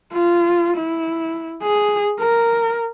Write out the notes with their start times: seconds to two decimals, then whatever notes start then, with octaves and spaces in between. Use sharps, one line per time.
0.13 F4
0.78 E4
1.62 G#4
2.20 A#4